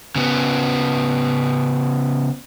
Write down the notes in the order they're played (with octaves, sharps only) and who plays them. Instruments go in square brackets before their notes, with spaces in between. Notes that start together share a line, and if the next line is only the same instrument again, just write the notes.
[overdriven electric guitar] C#3 B3